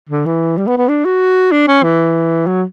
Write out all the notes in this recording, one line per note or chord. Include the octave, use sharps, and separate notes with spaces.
D3
E3
G3
B3
B3
D4
F#4
D4
C#4
E3
F#3